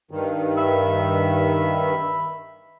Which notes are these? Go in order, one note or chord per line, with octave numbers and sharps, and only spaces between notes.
G2 D#3
E5 B5 E6